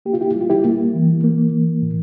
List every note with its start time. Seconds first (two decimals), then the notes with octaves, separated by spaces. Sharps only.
0.05 A#3 G4
0.13 F4
0.21 E4 G4
0.35 G3
0.41 F4
0.50 E4 G4
0.64 A#3
0.94 E3
1.24 A#3
1.52 E3
1.82 A2